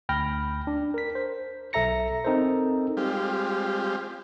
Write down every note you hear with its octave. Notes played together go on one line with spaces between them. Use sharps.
D2 G5 B5 F6 A#6
D4
A#4 B6
C5
B1 A4 E5 A#5 A#6 C#7
C4 D#4 A4 A#4 C5
G3 G#3 C4 F4 G4